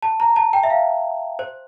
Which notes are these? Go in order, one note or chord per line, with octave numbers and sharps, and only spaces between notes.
A5
A#5
A5
G5
E5
F5
C5